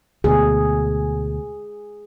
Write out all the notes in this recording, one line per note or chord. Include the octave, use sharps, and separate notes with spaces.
D2 B2 G#4